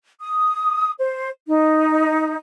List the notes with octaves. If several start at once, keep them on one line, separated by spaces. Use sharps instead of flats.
D#6
C5
D#4